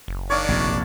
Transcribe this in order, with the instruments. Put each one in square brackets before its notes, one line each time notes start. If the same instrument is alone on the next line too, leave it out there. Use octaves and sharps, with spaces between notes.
[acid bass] F#1
[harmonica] D#3 D4 [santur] C#5 D5 F5
[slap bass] A#1 F2 C3